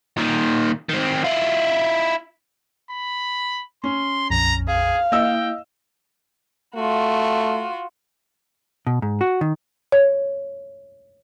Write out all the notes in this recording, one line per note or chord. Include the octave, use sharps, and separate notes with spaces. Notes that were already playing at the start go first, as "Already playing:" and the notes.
A#2 D#3
D#3 C4
E4 F4
B5
C#4 C6
A#1 F2 A#5
G#4 F5
A#3 E4 D#5 G5 E6
A3 F4 F#4
B2
G#2
F#4
D#3
C#5